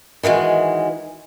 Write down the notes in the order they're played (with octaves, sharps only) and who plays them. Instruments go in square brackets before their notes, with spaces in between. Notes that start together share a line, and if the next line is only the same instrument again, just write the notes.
[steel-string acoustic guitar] D#3 E3 F#3 G#3